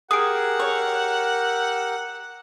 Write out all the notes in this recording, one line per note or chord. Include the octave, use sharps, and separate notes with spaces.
G4 G#4 A#4 F#5 D#6 E6 D7
C#5